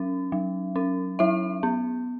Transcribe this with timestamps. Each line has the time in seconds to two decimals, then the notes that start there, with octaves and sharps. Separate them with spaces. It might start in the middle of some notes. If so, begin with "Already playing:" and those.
Already playing: F#3 C#4
0.32 F#3
0.76 C#4
1.19 F#3 E4 E5
1.63 B3